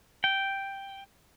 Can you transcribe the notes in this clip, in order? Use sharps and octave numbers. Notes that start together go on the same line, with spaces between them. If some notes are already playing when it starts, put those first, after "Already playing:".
G5